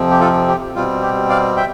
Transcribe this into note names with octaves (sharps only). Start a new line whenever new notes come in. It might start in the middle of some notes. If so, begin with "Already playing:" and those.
Already playing: F2 C3 F3 C4
G4
F4 A4
G4
B2 G3 C4 F4
G4
D5 F5
E5 G5